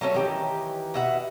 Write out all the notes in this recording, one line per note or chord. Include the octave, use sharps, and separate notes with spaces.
F#3 A3 A#3 C#4
D#3 E3 G4
B2 E5 F#5